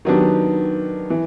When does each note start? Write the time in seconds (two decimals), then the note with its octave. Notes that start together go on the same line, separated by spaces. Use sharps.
0.05 D#3 F#3 B3 D4 G4
1.10 E3